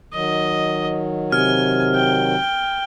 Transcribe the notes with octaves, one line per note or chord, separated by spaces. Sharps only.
D#3 F#3 D#5
C3 G#5 F6
G5